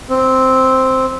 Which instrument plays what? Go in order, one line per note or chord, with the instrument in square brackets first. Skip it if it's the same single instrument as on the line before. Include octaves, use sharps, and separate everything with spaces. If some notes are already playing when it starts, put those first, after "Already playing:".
[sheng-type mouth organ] C4